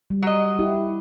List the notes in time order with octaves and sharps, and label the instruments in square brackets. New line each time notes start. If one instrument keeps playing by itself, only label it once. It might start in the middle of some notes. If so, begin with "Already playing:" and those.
[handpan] G3
[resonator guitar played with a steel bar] F#3 D#5
[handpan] E4 G4